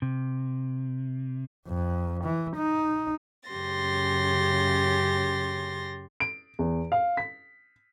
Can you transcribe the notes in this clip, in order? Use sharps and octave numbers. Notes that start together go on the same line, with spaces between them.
C3
F2
E3
D#4
F#2 C#3 G4 C6 A6 A#6
D7
E2
F5
B6